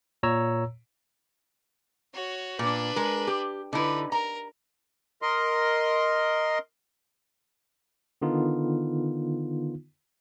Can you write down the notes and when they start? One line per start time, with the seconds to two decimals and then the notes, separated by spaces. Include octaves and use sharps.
0.23 A#2 C#5 A#5 E6
2.14 F#4 C#5
2.59 A#2 D4 B4
2.96 G#3 A#4
3.27 G4
3.73 D3 D#4 E4 B4
4.12 A#4 A#5
5.22 A#4 D#5 C6
8.22 D3 D#3 B3 D#4 F4